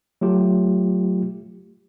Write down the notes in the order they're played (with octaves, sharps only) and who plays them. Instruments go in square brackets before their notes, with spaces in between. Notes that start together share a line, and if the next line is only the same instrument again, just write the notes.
[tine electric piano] F#3 A3 F4 G4